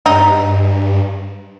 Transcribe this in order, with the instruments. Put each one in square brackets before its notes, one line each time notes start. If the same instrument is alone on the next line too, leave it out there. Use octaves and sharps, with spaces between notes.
[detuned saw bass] G2 [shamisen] D#4